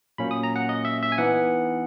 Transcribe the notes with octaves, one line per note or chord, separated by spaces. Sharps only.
A#2 F#3 A#3 C#4 B5
D#6
A#5
F#5
D#5
E5
E5
G#5
E3 B3 D#4 F#5